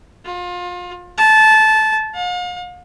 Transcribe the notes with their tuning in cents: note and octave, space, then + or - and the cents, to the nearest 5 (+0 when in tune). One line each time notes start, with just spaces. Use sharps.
F4 +30
A5 -15
F5 +40